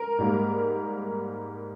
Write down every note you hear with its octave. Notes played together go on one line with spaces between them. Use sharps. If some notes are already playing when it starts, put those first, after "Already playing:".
Already playing: A#4
G#2 G3 A#3